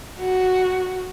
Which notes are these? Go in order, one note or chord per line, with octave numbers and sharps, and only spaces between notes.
F#4